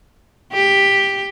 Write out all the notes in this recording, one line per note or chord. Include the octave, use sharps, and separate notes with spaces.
G4